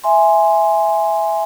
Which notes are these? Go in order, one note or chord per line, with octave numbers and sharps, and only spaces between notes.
E5 G#5 C6